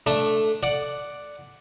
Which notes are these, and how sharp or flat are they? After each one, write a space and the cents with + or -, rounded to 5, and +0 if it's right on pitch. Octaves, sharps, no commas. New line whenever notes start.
A3 +0 D4 +5
D5 +0 F#5 +0